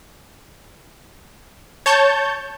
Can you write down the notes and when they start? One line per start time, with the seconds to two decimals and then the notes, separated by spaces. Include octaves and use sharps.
1.86 C#5 A5 G6